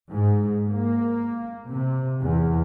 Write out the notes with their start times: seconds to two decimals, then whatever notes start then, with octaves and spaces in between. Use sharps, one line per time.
0.12 G#2
0.68 A#3
1.69 C3
2.22 E2